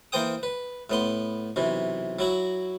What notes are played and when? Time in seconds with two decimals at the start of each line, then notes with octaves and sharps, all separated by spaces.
0.12 E3 A#3 C5 G5 D#6
0.43 B4
0.90 A2 B3 C6
1.56 B1 C3 E3
2.19 F#3 E4 F#4